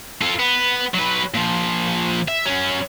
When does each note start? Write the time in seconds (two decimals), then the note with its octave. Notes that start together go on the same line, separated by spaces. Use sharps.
0.21 F4 A4
0.39 B3
0.94 F#3 B4
1.34 A#2 F3
2.28 E5
2.45 F#2 C#4